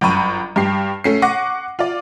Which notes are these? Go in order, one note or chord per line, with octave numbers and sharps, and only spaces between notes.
G1 F#2 B5 C#6 D#7
G2 G4 C7
A3 C#4 C7
F#5 C#6 D6 A#6 D#7
F4 D5